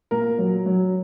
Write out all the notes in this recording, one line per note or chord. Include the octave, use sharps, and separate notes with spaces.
A#2 A#4
F#3
F#3